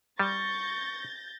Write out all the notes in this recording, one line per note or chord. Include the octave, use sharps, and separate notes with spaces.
G3 C#6 G6 A6 A#6